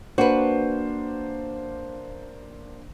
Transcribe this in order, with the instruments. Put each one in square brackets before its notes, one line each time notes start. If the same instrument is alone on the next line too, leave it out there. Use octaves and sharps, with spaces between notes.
[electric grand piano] A#3 D4 C5 [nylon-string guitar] F#4 B4